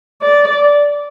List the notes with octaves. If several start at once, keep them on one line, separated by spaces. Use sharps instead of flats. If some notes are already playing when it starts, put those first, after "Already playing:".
D5